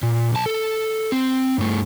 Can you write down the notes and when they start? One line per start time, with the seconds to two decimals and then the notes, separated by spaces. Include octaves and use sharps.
0.03 A#2
0.33 B1 A5
0.46 A4
1.12 C4
1.58 G2 A3